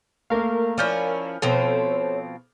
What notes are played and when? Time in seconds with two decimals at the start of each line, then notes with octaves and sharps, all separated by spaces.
0.30 A3 A#3 A#4 F5
0.78 F3 C#4 E4 D5 F6 G6
1.42 B2 F3 C4 A4 C5 C#5 F7